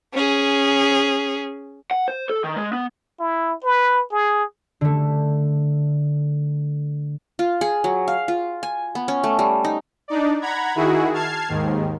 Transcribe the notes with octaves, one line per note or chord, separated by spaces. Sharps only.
C#4 G#4
F#5
C5
A4
D#3
G#3
B3
E4
B4
G#4
D3 A3
F4
G#4
F#3
F5
F4
G#5
B3
C#4
A3
G3
D#4
D4 D#4 D5
F#5 A#5 B5 G#6
D#3 E4 F#4 G#4
A5 F6 G#6 C7
D#2 G#2 D#3